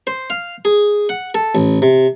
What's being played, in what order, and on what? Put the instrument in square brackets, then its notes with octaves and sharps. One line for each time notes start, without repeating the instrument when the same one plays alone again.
[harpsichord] C5
F5
G#4
F#5
A4
A1
C3